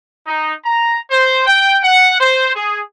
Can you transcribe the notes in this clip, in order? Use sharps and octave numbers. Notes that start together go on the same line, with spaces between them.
D#4
A#5
C5
G5
F#5
C5
G#4